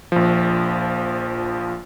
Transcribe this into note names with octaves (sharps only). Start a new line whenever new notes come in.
A#1 F3